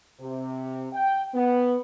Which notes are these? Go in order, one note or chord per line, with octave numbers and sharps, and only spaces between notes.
C3
G5
B3